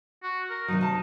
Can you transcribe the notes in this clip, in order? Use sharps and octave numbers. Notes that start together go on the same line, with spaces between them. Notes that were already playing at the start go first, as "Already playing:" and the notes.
F#4
A#4
C3 D#3 F#3 D#4
C3 A5